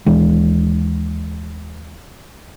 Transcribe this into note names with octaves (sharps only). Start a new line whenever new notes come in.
D#2 E3 G#3 D4